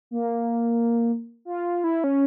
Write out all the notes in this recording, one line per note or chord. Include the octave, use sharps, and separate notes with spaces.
A#3
F4
E4
C#4